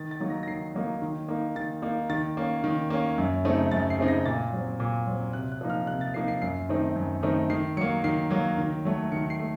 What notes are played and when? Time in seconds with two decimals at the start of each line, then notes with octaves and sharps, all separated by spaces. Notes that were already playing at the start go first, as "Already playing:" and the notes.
Already playing: D#3 A6
0.11 A6
0.20 F#3 A#3 D#4
0.30 A#6
0.43 A#6
0.47 D#3 C7
0.75 F#3 A#3 D#4
1.02 D#3
1.28 A#3 D#4
1.55 D#3 A6
1.82 A#3 D#4
2.10 D#3 A6
2.37 A#3 C#4
2.64 D#3
2.90 A#3 C#4
3.18 F#2
3.45 C#3 A3 C4 D#4
3.71 F#2 A6
3.90 C7
3.99 C#3 A3 C4 D#4
4.08 A#6
4.25 A#2 A6
4.53 F#3 C4
4.80 A#2
5.07 F#3 C4
5.33 C3 F#6
5.52 F#6
5.61 F3 A#3 D#4
5.70 F6
5.87 C3 F#6
6.01 A6
6.14 F3 A#3 D#4 C7
6.28 C7
6.42 F#2 C7
6.69 D#3 A3 C4 D#4
6.96 F#2
7.23 D#3 A3 C4 D#4
7.50 D#3 C7
7.77 F#3 A#3 C#7
8.04 D#3 C7
8.30 F#3 A#3
8.58 D#3
8.85 F#3 A3
9.12 D#3 C#7
9.30 C7
9.40 A3